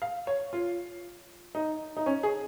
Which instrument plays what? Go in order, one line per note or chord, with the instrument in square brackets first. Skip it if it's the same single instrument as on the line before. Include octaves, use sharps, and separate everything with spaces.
[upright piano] F5
C#5
F4
D#4
D#4
C#4
G#4